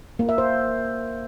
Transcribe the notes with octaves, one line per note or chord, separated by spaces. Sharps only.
A#3
E5
C5